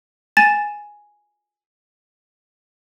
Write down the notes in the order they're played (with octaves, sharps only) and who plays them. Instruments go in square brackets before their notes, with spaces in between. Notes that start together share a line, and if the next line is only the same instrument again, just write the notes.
[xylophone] G#5 A6 E7